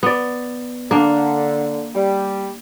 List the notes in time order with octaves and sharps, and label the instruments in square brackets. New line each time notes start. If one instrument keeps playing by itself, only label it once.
[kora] B3 D5
[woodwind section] D3 [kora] A#3 D4
[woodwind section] G3